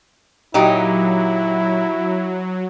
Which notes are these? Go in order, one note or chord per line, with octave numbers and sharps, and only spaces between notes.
A#2 F#3 D#4 E4 G4